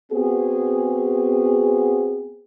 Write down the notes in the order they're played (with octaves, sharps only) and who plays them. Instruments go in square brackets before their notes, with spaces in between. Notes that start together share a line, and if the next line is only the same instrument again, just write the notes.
[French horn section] B3 C4 F#4 G#4